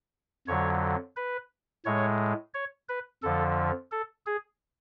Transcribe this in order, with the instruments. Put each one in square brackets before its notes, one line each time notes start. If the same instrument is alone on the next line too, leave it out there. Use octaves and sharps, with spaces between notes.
[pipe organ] F2 D3 F#3 C#5
B4
A2 G#3 C#5
C#5
B4
F2 D3 F3 A4
A4
G#4